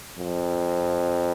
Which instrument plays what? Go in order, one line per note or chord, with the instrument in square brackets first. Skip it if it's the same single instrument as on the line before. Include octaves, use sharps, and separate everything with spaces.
[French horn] F2